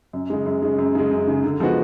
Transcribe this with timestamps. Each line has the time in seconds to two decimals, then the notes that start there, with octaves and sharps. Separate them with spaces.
0.13 F#2
0.30 C#3 G#3
0.46 F#2
0.62 C#3 G#3
0.78 F#2
0.95 C#3 G#3
1.11 F#2
1.27 C#3 G#3
1.44 D3
1.60 F3 G#3 B3 F#4